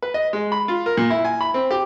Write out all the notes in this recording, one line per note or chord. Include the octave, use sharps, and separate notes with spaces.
B4
D#5
G#3
B5
F4
A#4
A#2
E4
G#5
B5
C4
G4